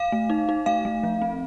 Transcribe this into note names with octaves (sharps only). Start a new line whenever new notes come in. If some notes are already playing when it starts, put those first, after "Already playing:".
Already playing: F5
A3
D#4
D#4
A3 F5
A3
F3
C4